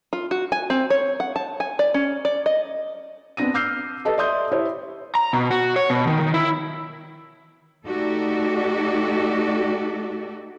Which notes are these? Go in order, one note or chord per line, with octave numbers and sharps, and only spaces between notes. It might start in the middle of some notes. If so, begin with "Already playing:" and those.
F4
F#4
G#5
C4
C#5
F#5
A5
G#5
D5
C#4
D5
D#5
B3 C4 D4 A#6 D#7
D6 E6 F6 G6 C7
G4 A4 B4 D#5 A5
D5 E5 C6 D#6 G6
E4 G4 C5 C#5 E5
A#5
B2
F#4
C#5
B2
D#3
D#3
E4
A3 D#4 F#4 G4 A4 D5